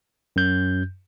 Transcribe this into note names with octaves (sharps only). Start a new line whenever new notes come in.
F#2 G6